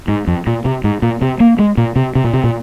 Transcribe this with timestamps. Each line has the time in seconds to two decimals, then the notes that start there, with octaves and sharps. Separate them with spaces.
0.08 G#2
0.27 F2
0.47 A#2
0.65 C3
0.84 G#2
1.02 A#2
1.22 C3
1.40 A#3
1.59 G#3
1.77 A#2
1.96 C3
2.15 C3
2.24 A#2
2.33 C3
2.44 A#2